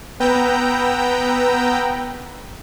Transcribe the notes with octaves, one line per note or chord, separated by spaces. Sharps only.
B3 B4 G5 A#5 E6 G6